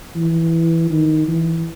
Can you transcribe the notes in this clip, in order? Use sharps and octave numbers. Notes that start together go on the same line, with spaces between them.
E3
D#3
E3